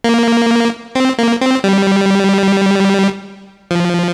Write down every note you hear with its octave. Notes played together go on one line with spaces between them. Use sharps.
A#3
C4
A#3
C4
G3
F3